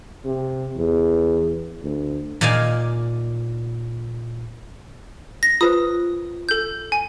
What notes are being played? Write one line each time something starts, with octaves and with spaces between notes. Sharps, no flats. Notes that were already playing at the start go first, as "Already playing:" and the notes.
C3
E2
D2
A#2 A#3 D#4 D5 F5 G#5
A#6
F4 B4 C5 D#6
A4 G6
G#5